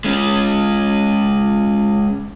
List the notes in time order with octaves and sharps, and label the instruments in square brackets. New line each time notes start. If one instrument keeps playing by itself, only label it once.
[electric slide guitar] G#3 C#4